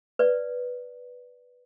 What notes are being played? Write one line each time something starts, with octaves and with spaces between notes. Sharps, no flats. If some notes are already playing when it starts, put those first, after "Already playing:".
B4 D5